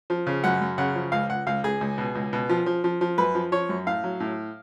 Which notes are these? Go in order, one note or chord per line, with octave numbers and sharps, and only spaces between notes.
F3
C#3
F#2 F#5
F#2
C#3 F#5
F3
C#2 F5
C#2 F#5
C#2 F5
C#2 G#4
C#2
B2
C#2
B2
F3
F3
F3
F3
F#2 B4
F3
F3 C#5
F#2
A2 F5
F#3
A2